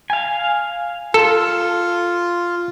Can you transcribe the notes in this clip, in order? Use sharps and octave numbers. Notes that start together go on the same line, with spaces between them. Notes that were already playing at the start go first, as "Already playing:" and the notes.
F5 G#5
F4 A4